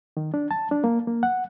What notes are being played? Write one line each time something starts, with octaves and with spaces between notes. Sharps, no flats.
D#3
D4
A5
D4
A#3
A#3
F#5